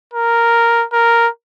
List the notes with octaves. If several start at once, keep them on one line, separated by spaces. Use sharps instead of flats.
A#4
A#4